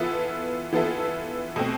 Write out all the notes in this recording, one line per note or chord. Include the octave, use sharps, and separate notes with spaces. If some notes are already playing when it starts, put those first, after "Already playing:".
Already playing: E3 B3 F4 A4 E5
E3 B3 F4 A4 E5
B2 A3 C4